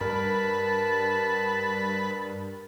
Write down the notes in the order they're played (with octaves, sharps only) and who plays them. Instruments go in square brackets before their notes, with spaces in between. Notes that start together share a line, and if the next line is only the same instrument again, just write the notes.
[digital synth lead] G2 [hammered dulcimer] A#4 [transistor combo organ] B4 [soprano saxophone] A5